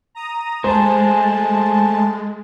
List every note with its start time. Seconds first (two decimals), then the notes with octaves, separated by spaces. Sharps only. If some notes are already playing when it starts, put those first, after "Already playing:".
0.15 A#5 D#6
0.64 G#3 A3 G#4 C5 A5